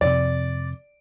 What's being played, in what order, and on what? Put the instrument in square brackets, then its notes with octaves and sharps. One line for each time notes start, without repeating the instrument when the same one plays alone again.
[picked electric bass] F2 C3 [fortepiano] D5